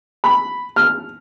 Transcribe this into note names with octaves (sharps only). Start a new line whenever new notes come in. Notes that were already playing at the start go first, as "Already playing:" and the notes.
B5
F6